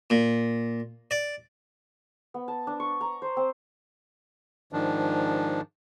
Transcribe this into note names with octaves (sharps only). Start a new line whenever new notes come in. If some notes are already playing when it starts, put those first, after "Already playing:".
A#2
D5
B3
A5
D4
C#6
A#5
C5
C4
G#2 D#3 F3 D4